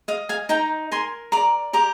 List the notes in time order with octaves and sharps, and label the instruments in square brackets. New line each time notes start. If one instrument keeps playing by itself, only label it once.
[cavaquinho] D#5 F5
F5 G#5
D#4 G5 A#5
A#4 G#5 C6
D5 A#5 D6
G4 A#5 D6